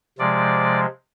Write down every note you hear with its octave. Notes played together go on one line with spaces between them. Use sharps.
C3 F3 G#3 D5